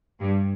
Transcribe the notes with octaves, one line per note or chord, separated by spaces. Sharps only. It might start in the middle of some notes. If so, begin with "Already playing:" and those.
G2